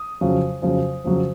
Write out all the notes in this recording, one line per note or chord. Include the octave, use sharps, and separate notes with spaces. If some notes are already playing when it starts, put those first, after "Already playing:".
Already playing: D#6
F2 C#3 F#3
F2 C#3 F#3
F2 C#3 F#3